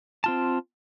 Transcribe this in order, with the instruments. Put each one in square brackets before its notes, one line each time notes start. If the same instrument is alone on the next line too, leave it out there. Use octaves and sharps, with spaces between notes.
[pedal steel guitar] C4 F4 A5